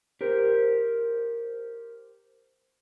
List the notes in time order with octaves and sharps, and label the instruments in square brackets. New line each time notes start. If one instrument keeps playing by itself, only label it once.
[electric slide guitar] G4 A#4 C5